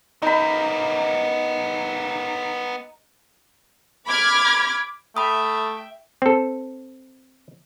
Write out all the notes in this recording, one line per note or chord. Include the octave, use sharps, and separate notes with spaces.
B3 D#4 A#4 B5
B5 D6 F6 G#6
A3 E5 G5 B5 D#6
C4 A4